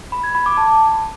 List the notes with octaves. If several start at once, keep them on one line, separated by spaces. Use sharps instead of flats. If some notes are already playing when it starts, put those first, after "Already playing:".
B5
G#6
B5
D6
A5